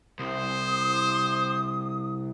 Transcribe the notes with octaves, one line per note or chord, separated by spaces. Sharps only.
C2 C5 D#6